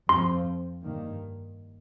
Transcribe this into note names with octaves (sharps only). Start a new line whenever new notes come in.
F2 F3 C4 C6
G2 D#3 A#3